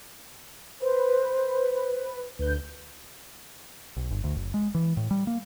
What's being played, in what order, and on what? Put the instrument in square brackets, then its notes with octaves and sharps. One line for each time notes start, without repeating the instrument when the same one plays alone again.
[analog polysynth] B4 [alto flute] C5
[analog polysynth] D2 G6 [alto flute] B4
[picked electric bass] B1
G1
D2
F#1
G#3
E3
A2
G3
A#3